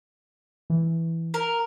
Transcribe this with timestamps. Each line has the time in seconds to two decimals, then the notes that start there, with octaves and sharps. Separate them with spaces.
0.70 E3
1.34 A#4